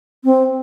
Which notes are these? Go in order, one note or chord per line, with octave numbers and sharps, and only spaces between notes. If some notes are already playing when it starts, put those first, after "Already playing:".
C4